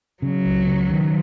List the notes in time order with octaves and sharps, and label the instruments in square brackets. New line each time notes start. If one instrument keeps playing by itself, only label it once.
[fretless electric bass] C#3 [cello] F#3
[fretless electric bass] C#2
C#3
D#3